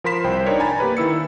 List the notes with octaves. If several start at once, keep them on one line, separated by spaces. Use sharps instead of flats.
F3 A#4 B5 C6 B6 E7
C2 C5 G5
D4 D#4 A#4 C#5 D5
G#5 A#5 B5 A6
A#3 G4 B4
D#3 E4 E6 C#7